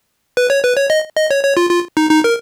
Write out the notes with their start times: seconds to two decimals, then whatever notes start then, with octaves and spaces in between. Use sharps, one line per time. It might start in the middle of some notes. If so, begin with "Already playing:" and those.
0.37 B4
0.50 C#5
0.64 B4
0.77 C#5
0.90 D#5
1.17 D#5
1.31 C#5
1.44 C#5
1.57 F4
1.70 F4
1.97 D#4
2.10 D#4
2.24 A#4